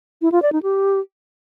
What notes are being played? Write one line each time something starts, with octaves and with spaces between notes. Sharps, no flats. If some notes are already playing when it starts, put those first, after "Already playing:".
E4
F4
D5
D#4
G4